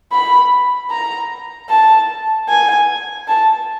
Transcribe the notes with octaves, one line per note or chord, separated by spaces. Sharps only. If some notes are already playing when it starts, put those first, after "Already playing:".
B5
A#5
A5
G#5
A5